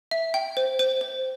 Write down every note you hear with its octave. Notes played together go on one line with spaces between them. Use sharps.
E5
G5
C5
C5
C5